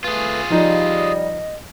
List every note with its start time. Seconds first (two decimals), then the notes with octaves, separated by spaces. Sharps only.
0.04 A3 F4 G#4 B4 G#5
0.50 F3 G3 D#4 D#5